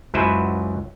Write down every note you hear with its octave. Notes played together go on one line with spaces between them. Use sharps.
C#2 F#2 F#3 E4 B4 C5